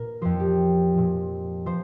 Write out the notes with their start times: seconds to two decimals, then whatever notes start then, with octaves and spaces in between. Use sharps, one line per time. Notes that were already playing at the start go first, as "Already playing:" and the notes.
Already playing: A#2 A#4
0.21 F2 F3 C5
0.40 G4
0.94 A#2 F3
1.66 F3 C5